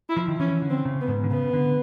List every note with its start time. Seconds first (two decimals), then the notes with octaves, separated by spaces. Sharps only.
0.09 E4
0.16 F3
0.28 D#3
0.39 E3 C#4
0.62 D3
0.70 C4
0.85 C#3
1.01 B3
1.08 G#2
1.24 D3
1.31 C#3 B3
1.53 D3